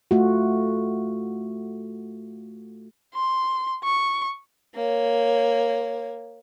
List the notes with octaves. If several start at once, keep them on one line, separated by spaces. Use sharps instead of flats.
A3 F4 F#4
C6
C#6
A#3 C#5